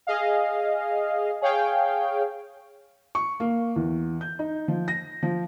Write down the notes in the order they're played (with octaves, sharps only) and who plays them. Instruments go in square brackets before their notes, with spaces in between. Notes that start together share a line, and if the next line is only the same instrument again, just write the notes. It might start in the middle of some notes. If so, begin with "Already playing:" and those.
[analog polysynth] G#4 D#5 F5
G#4 C#5 F5 G5
[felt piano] C#6
A#3
E2
G6
D#4
F3
A#6
F3